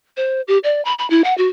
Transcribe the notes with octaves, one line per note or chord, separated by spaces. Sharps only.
C5
G4
D5
B5
B5
E4
F#5
F#4